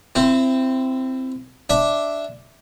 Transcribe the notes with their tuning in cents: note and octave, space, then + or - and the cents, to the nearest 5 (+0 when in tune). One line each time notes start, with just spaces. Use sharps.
C4 -5 E4 +25
D4 +0 E5 +0